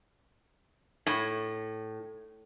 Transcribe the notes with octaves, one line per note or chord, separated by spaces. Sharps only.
A2